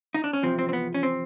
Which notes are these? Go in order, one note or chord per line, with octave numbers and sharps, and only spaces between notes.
D#4
D4
C#4
E2 C3 F3 C4
C4
C4
B3
C#4
C4